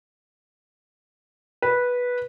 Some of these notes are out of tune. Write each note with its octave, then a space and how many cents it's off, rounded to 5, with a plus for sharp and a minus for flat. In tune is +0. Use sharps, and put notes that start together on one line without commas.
B4 -10